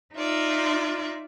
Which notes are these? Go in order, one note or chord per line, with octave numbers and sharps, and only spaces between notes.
D#4 F4 D5 E5